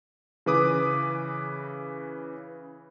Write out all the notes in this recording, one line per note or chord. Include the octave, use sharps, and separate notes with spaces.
C#3 E3 B4 D6 D#6